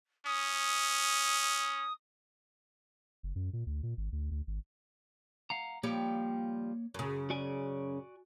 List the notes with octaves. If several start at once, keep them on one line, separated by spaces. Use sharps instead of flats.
C#4 D#6
F#1
F#2
A#2
D2
A#2
G#1
D2
D2
G#1
F5 F#5 A#5
F3 G3 A#3 G4 C#5
F#2 C#3
F#4 D5 G#5